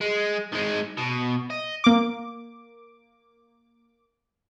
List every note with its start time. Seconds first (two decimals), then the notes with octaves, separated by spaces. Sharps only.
0.01 G#3
0.53 D#3 G#3
0.97 B2
1.50 D#5
1.84 A#3 D6